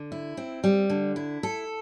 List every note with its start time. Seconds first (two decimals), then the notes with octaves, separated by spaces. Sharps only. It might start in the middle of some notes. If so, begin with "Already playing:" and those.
Already playing: D3
0.12 E4
0.37 C4
0.64 G3
0.90 D3
1.16 E4
1.43 A4